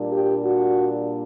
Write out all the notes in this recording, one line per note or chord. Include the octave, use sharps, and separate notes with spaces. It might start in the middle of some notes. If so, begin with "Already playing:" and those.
Already playing: A#2 G3 A#3 D4
G4
F#4